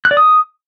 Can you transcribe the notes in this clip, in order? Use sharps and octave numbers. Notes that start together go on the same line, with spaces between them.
F#6
D5
D#6